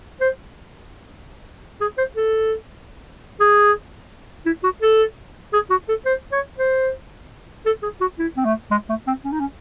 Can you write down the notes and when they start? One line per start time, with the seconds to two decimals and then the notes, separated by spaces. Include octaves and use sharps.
0.21 C5
1.81 G#4
1.98 C5
2.16 A4
3.40 G#4
4.46 E4
4.64 F#4
4.82 A4
5.53 G#4
5.70 F#4
5.89 A4
6.05 C5
6.32 C#5
6.59 C5
7.66 A4
7.83 G#4
8.01 F#4
8.19 E4
8.37 C4
8.45 A3
8.71 G#3
8.89 A3
9.07 C4
9.25 C#4
9.32 D#4
9.40 C#4